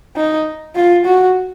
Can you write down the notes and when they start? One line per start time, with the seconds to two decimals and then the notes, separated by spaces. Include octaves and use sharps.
0.16 D#4
0.75 F4
1.05 F#4